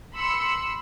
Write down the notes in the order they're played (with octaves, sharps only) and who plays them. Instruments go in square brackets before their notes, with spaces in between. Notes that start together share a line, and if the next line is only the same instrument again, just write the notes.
[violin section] B5 C6 E6 C#7